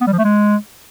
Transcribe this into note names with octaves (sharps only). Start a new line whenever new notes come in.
B3
G3
F3
A3
G#3